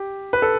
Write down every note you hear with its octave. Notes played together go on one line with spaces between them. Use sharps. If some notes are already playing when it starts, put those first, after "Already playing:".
Already playing: G4
B4
A4